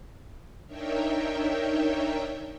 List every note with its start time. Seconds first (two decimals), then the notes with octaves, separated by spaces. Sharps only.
0.66 D4 D#4 A#4 C#5 E5 G5